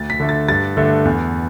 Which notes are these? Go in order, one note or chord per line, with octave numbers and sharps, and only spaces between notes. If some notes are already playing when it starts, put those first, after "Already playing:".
Already playing: D2 A6
B6
D3 A3
A6
G2 A6
D3 A3
E2